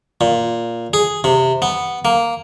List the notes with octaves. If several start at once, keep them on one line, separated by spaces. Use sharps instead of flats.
A#2
G#4
C3
B3
A#3